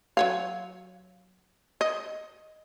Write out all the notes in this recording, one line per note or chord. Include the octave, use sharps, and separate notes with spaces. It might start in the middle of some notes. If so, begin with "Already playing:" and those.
F#3 C#5 F5
D#5